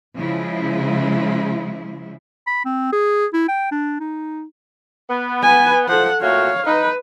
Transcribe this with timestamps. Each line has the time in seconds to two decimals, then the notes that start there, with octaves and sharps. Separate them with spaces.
0.16 C#3 F3 G#3 E4
2.47 B5
2.65 C4
2.92 G#4
3.33 E4
3.48 G5
3.71 D4
4.00 D#4
5.10 B3
5.43 B4 G#5
5.88 F3 A4 F#5
6.22 A#2 A3 F#4 C#5 F5
6.67 D#4 B4